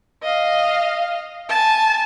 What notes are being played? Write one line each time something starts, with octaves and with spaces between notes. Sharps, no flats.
D#5 F5
G#5 A5